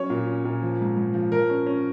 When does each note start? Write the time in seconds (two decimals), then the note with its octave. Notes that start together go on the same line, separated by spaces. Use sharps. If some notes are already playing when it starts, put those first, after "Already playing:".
Already playing: F#3 C#4 C#5
0.10 A#2
0.27 C#4
0.45 A#2
0.62 F3
0.80 G#2
0.97 G#2
1.14 F3
1.32 F3 A#4
1.50 C#4
1.66 C#4